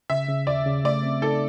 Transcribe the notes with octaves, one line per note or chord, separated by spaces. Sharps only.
C#3 E5
C#3
D#2 D5
C#3
A3 D5
C4
D#4 A4